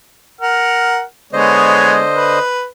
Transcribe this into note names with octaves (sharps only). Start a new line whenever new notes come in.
A#4 F#5 F6
D3 G#3 B3 C5 C#5 D#5
B4